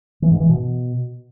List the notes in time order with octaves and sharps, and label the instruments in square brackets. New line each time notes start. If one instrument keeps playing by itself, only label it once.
[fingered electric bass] E3
G#2
E3
B2